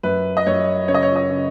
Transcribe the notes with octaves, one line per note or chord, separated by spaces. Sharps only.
F#2 B4
D#5
F#2 C#5
C#3 C#5
D#5
C#5
D#5
C#3